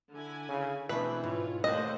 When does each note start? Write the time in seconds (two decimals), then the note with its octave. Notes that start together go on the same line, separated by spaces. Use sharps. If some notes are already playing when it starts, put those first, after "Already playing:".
0.12 D3 E4 G#5
0.49 C#3
0.89 B2 E3 A3 C4 D4 G#4 B4
1.24 G#2 F4 C#5
1.64 D#2 A3 C5 D#5 E5 F#5 A5